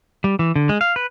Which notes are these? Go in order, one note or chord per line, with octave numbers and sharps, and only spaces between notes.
G3
E3
D3
G#3
F5
B4